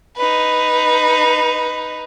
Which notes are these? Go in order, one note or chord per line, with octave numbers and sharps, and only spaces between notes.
D#4 B4